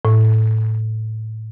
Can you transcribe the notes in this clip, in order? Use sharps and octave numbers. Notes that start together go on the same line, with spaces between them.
A2